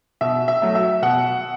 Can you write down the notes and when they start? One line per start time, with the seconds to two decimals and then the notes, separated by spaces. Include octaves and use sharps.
0.21 B2 E5
0.48 E5
0.62 F#3 A3
0.75 E5
1.02 B2 F#5